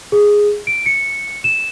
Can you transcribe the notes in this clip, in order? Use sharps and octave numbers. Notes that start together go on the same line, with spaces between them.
G#4
D7
C#7
E7